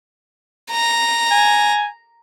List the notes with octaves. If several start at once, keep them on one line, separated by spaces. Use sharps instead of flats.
A#5
G#5